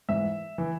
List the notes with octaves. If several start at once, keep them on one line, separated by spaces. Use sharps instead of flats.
G#2 E3 E5
E3